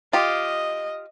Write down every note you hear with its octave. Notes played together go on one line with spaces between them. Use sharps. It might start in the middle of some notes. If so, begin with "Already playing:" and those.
F4 G4 D#5